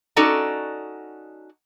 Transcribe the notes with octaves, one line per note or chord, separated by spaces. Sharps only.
C#4 D#4 F#4 A4 D5 D#5